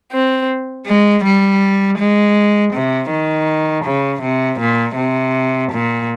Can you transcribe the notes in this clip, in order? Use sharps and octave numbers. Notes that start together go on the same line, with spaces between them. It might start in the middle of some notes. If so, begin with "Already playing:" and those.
C4
G#3
G3
G#3
C3
D#3
C#3
C3
A#2
C3
A#2